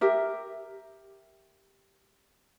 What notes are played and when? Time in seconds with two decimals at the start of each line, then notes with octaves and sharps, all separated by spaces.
0.01 G4 A#4 E5